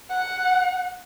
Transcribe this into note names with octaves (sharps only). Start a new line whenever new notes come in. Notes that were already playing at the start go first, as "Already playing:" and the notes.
F#5